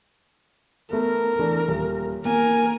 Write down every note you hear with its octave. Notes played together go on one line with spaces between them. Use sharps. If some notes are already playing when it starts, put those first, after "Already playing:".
A3 B3 A#4
E3 A3 D4
D#1
A#3 A#4 G#5